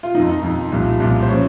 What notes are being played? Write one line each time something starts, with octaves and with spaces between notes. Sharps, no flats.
F4
F2 D#3 D#4
D#4
F2 D#3
C2 A#2 F3
C2 A#2 F3
C5
C#3 F3 C#5